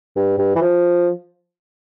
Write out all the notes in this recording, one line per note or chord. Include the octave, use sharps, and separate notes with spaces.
G2
G2
E3
F3